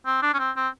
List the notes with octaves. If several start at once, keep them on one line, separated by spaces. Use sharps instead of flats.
C4
D4
C#4
C4
C4